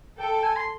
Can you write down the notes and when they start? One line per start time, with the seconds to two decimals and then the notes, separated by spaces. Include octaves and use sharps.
0.19 A4 G5
0.43 G#5
0.56 C6